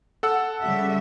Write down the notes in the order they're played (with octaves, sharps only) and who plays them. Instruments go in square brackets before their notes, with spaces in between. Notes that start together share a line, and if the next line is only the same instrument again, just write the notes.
[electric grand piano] A4 F#5 E6
[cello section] C#3 G3 E5